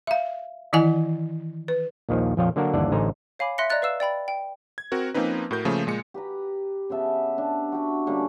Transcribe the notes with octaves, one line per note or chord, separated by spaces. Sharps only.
E5 F5
D#3 E3 E4 D#5 F#5 G#5
B4
A#1 D#2 D#3 F3
A#1 F2 F3 C#5 F5 G5
D3 F#3 A#3 D4 F#4 A#4
G1 D#2 E3 D4 D5 F#5
A1 D3 D#4 C5 G#5 A#5
C#5 F5 G#5 B5 D6
E5 C6 F#6 A#6 B6 C#7
D5 D#5 A#5 F#6 A6
B4 F5 E6 E7
D5 G5 B5 A6
G5
G#6
C4 F#4 A#4
F3 A#3 C4 C#4 D#4 B4
A2 F#4 A#4 G6
C#3 F3 A3 A#3
A#2 G#3 C#7
G4 B4 A#5
C#3 B3 E5 A5
D4
F#4 G5
D3 G3 A#3 C#4